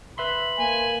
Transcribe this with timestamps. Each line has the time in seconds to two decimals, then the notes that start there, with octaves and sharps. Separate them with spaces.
0.18 B4 E5 B5 C6
0.59 A#3 G#5